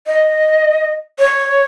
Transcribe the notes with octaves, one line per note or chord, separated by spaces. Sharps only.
D#5
C#5